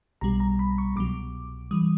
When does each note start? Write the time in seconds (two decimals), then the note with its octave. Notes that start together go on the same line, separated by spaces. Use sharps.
0.21 B1 B2 G3 A#5
0.40 A#5
0.59 B5
0.78 C#6
0.96 C2 B2 F#3 D6
1.71 E3 G3 D#6